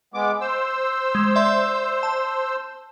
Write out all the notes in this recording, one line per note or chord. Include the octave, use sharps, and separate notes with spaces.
G#3 B3 D6
C5 E6
G#3
D5 E5 C6
A5